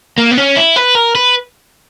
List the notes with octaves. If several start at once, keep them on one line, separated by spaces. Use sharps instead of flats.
A#3
B3
C#4
E4
B4
A#4
B4